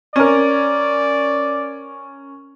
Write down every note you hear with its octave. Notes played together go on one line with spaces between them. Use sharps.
C#4 A#4 D5